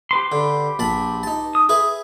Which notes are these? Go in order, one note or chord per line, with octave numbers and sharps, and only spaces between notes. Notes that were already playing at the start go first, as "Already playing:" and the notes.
G4 B4 C6
D3
A#1 A5 B5
D#4 A5
D#6
G#4 B4 E5